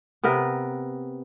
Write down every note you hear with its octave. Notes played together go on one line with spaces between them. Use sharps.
C3 B3 A#4 B4